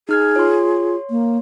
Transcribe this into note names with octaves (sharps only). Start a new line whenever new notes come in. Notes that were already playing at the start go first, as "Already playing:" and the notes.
D#4 G#4 F6 G#6
F4 C#5 C6
A#3